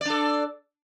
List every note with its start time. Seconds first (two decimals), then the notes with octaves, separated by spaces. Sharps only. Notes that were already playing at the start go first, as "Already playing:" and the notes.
0.01 D5
0.05 D4
0.10 A4